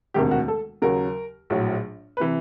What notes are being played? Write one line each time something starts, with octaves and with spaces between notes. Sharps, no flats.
E1 D2 C3 D#3 G4
F#4
A4
D#2 C#3 F#3 A#4
A#1 A2 F#3
B4
C3 E3